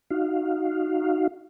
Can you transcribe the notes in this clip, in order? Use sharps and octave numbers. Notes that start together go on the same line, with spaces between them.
D#4 F#4 F5